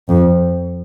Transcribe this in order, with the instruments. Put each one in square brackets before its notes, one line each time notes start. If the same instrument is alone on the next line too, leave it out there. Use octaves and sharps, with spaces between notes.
[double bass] F2